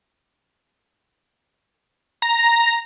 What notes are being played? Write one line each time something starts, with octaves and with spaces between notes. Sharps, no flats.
A#5